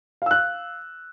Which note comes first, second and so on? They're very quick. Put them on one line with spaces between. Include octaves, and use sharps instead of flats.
F5 E6 F#6